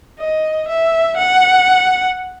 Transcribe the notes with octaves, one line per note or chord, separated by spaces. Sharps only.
D#5
E5
F#5